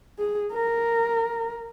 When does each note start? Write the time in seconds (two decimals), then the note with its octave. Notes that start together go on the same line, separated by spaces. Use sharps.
0.19 G#4
0.53 A#4